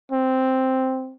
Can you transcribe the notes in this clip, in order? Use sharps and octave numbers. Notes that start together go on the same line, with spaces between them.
C4